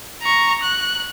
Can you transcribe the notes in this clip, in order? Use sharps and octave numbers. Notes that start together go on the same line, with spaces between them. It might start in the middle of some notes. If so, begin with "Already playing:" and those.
A#5 C#6
F#6